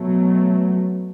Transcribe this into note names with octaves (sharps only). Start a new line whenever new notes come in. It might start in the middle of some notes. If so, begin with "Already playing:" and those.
Already playing: B2 F#3 A3